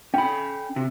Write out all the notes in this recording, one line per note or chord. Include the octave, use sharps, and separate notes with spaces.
C#4 G5 B5
C3